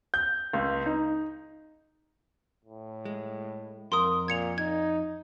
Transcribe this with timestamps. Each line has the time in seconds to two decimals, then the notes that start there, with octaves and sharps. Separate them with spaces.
0.14 G6
0.53 C#2
0.86 D#4
2.64 A2
3.05 G#3
3.92 F2 A#4 C6 D#6
4.28 A#2 G#6 C#7 F7
4.58 D#4 G#6